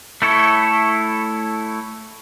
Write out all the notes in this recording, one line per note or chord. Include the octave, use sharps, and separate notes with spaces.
A3 E4 A4 C#5